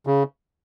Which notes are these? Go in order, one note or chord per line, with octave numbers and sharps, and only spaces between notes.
C#3